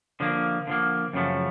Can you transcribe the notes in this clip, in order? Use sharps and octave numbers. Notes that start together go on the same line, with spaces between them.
D3 F3 A#3
D3 F3 A#3
F#2 C#3 F3 A3